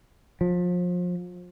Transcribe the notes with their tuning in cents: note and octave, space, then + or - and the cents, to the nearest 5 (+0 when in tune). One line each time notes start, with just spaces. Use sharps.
F3 +30